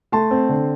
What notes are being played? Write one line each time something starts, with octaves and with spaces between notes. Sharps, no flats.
A3 A5 C6
C4
D3